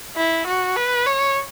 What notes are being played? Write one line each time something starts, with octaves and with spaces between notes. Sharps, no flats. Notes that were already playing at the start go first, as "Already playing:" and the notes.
E4
F#4
B4
C#5